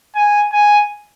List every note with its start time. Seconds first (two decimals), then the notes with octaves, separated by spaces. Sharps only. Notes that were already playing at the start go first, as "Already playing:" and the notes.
0.15 G#5
0.52 G#5